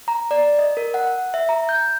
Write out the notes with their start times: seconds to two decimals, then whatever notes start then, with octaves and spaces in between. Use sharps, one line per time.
0.08 A#5
0.31 D5
0.59 D#5
0.77 A#4
0.94 F#5
1.34 E5
1.49 A#5
1.69 G6